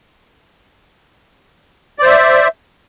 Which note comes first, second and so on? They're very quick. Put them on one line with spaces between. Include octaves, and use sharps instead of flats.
D5 C5 E5